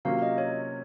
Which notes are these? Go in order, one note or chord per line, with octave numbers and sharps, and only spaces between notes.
C3 F#3 A#3 C#4 F4 F5
D#5
C#5